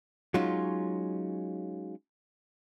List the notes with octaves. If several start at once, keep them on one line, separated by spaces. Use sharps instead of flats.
F#3 G#3 C#4 D#4 F4